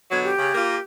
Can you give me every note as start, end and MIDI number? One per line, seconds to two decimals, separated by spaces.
0.11 0.31 47
0.11 0.31 50
0.11 0.31 54
0.11 0.19 92
0.24 0.83 67
0.38 0.54 49
0.54 0.76 58
0.54 0.76 65
0.54 0.76 70